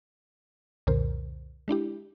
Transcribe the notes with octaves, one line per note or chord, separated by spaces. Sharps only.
C2 F2 A#2 D3 A#4 C5
G#3 D4 E4 G4